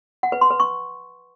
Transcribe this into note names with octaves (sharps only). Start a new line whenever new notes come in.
F#5
B4
C6
B4
C#6